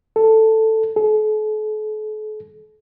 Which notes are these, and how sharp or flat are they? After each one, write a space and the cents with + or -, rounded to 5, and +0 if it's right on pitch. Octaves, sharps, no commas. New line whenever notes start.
A4 +5
A4 -45